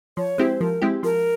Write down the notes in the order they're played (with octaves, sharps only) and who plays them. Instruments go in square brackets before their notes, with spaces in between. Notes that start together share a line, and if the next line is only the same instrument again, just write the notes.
[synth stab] F3 [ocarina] C#5
[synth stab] G#3 C4 E4 G4 [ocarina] C5
[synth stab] F3 [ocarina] A#4
[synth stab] G#3 C4 E4 G4
[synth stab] F3 [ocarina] A#4